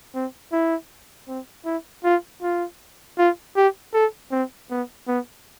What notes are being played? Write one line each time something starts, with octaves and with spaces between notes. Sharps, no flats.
C4
E4
C4
E4
F4
F4
F4
G4
A4
C4
B3
B3